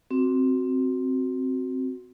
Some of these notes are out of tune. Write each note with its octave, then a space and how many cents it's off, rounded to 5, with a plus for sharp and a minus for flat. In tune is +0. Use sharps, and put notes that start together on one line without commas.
C4 +0 F#4 +0